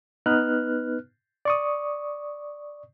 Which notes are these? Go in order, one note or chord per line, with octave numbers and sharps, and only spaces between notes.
B3 D#4 B4 F6 F#6
D5 C#6 D#6